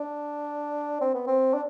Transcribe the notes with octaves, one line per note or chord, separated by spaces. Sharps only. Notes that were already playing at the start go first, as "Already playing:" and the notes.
Already playing: D4
C4
B3
C4
D4